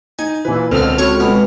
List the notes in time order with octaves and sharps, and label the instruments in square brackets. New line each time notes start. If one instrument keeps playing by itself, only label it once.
[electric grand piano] D#4 [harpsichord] G#5
[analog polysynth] A#2 E3 [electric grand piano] B4
[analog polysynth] C#2 A4 F6 [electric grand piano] B2 D3 C4
[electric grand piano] C4 [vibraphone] F#4 B5 [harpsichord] C#5 C#6
[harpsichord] B2 [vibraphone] G#3 B4 B5